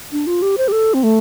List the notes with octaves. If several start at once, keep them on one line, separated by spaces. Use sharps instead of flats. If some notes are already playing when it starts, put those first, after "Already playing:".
D4
F4
G4
C5
G4
A4
C4
A3